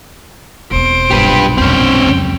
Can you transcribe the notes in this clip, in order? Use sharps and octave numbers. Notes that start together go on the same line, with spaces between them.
E1 C4 C5 D7
B1 G2 A#2 G4 B4
F1 F2 C4 C#4 G5
C#2 F#2